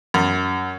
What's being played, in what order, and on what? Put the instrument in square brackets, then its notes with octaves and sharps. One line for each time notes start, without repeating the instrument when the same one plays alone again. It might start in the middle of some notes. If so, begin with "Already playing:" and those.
[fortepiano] F#2